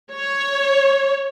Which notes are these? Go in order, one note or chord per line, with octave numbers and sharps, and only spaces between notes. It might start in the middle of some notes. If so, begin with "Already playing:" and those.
C#5